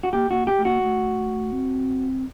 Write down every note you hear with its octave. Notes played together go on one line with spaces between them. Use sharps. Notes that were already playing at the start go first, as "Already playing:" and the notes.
F#4
A#3 G4
A#3 F#4
G4
A3
A#3 F#4
A3
C4